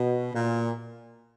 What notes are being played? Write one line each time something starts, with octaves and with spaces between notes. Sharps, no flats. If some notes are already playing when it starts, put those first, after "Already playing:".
Already playing: B2
A#2